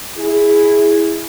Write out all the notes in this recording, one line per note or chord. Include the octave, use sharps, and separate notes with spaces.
E4 G#4